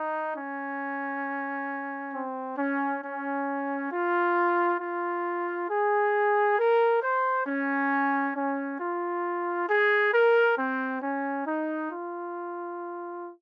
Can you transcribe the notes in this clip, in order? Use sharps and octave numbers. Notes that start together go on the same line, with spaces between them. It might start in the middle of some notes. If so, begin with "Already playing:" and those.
Already playing: D#4
C#4
C4
C#4
C#4
F4
F4
G#4
A#4
C5
C#4
C#4
F4
G#4
A#4
C4
C#4
D#4
F4